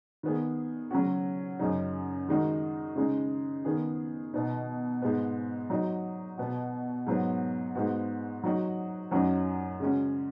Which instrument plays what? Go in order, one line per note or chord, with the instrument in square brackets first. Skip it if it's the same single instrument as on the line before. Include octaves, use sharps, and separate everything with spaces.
[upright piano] D#3 B3 G#4
C#3 F#3 C#4 F#4
F#2 C#3 F#3 D#4
D#3 G#3 D#4 F#4
C#3 G#3 D#4
D#3 B3 G#4
B2 B3 D#4
G#2 G#3 B3
F#3 D#4 F#4
B2 B3 F#4
G#2 F#3 B3
G#2 G#3 B3 F#4
F#3 D#4 F#4
F#2 F#3 D#4 F#4
C#3 G#3 C#4 F#4